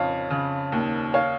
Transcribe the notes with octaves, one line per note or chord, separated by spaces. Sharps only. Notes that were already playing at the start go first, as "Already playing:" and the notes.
Already playing: F2 C#3 C#5 F5
C#3
D#2
C#5 F5